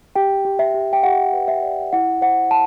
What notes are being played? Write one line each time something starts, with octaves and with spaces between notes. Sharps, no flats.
G4 G5
G4
E5
G4
G5
G4 F#5
B4
E5
D5
E4 F#5
C5 F#5
A5